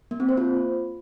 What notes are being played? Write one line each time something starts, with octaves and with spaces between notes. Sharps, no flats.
A#3
C4
C5
F4